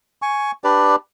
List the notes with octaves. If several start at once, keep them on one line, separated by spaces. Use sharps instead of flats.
G#5 C#6
D4 G4 B4 D5